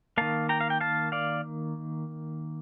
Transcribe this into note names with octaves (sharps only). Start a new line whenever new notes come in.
D#3 A#3 F5 A5
G5 A#5
F5
G5
F5 A5
D5 F5